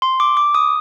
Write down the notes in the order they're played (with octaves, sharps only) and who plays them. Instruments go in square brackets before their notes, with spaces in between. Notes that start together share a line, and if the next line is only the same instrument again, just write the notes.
[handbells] C6
D6
D6
D#6